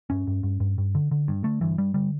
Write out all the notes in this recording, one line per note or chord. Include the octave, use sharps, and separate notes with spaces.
G2 C#4
G2
G2
G2
G2
D3
D3
G2
D3 A3
G2 E3
G2 G3
D3 G3